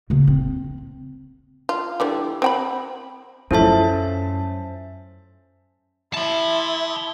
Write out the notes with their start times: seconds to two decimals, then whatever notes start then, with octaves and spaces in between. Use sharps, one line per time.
0.10 C#3 A#3
0.27 C4
1.69 F4
2.00 D3 E3 G3
2.42 C4 G5 B5
3.51 F#2 A2 F3 A3 C#4 C5 E5 A5
6.14 E4 A5 C6